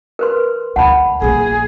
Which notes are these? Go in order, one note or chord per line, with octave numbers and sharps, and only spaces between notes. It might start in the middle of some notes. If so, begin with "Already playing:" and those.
A#4 B4 C6
D2 D3 F#5 A5 B5
A#1 A3 G#4